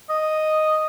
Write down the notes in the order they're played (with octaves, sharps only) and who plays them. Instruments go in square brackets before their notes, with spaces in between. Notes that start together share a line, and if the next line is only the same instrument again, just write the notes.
[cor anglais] D#5